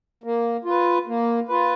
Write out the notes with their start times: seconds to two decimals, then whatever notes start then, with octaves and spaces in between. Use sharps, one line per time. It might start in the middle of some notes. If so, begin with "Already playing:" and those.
0.24 A#3
0.65 F4 B4
1.07 A#3
1.49 F4 B4